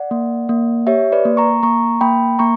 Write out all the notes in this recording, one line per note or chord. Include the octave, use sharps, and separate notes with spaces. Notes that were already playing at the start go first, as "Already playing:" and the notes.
Already playing: D5 F#5
A#3
A#3
G4 C#5 E5
B4 D5
A#3
A#5 C#6
A#3 A#5 C#6
A#3 G5 B5
A#3 A#5 C#6